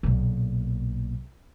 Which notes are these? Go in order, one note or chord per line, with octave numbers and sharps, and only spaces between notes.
B1 A#2